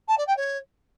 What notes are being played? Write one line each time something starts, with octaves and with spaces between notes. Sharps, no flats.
A5
D5
G5
C#5